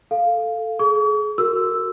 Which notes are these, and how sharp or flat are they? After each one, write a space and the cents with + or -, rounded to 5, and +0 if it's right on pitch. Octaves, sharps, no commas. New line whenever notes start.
A4 +5 F5 +0
G#4 +30 C#6 +45
F#4 +0 A#4 -20 E6 +0